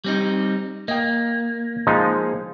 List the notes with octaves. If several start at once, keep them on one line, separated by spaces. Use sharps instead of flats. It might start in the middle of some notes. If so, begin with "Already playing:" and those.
G3 C4 D#4
A#3 D#5 G5
F3 G#3 D#4